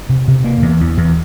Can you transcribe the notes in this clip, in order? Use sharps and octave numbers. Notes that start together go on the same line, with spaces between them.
C3
C3
A#3
E2
E2
E2